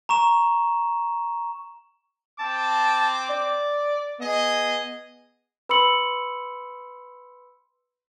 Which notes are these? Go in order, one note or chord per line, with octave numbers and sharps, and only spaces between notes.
A#5 C#6 E7
C4 A5 D6
D5
B3 G#4 D#5
B4 B5 C6 E6 C#7 F#7